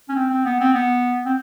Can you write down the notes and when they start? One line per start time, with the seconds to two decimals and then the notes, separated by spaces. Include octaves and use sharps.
0.09 C#4
0.16 C4
0.30 C4
0.45 B3
0.60 C4
0.74 B3
1.26 C4